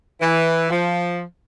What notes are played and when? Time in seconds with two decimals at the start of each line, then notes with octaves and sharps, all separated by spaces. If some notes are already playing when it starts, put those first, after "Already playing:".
0.21 E3
0.70 F3